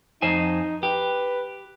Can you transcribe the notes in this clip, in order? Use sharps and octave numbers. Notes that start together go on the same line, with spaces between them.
F2 D#4 C5 G#5
G4 B4